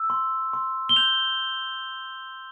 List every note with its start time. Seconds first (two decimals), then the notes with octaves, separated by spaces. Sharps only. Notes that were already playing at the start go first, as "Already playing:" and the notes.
Already playing: E6
0.10 C6
0.53 C6
0.89 G7
0.96 G6 F7